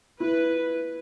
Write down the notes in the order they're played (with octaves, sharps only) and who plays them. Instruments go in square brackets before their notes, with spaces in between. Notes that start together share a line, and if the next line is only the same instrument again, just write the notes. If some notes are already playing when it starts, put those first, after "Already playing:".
[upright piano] E4 [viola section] B4